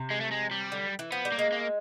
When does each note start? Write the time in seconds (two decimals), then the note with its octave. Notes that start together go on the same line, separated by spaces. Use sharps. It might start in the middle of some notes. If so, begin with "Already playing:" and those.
Already playing: C3
0.11 G#3
0.21 A3
0.32 G#3
0.51 G3
0.72 D3
0.99 E3
1.12 F3 B3
1.25 G3
1.32 A#3
1.39 G#3
1.52 A#3